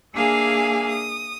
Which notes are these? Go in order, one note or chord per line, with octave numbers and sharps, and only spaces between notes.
A#3 D4 G#4 E5 F5 G#5
D#6